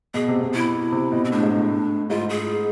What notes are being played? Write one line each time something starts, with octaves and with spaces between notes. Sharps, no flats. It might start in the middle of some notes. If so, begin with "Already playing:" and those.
B2 G#4
C3
B2
E4
C3
B2
C4
A2 D4
G#2
A2
G#2 F4
G#4